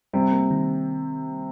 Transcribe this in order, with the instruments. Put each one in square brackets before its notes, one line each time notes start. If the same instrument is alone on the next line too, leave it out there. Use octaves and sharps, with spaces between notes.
[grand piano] C3 C4 [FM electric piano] G3
[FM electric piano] A#3
D#3